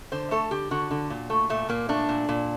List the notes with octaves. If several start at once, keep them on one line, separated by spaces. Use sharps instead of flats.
D3 C5
A3 A4
D3 G4
D3 F#4
D3
A#2
A3
A#2 A3
A#2 A#3
A3 D4
A#2
A#2